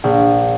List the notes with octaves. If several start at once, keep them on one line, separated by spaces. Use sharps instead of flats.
A#1